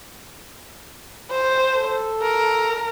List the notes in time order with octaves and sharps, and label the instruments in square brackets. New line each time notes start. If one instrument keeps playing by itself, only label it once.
[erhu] C5
[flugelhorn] A4
[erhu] A#4